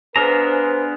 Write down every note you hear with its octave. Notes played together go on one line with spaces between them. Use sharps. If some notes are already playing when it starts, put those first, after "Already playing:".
B3 D4 G#4 B4 C5 F5 A#5